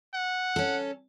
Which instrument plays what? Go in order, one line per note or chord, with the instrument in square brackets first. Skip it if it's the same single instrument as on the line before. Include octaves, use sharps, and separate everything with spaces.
[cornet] F#5
[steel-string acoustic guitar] C#4 A4